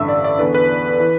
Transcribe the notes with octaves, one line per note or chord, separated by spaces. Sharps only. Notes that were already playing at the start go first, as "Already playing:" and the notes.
Already playing: A1 G2 D3 E5 E6
D5
D5
E2 D3 B4
B4
E3